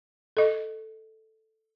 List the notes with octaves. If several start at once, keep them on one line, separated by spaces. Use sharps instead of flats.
A4 D#5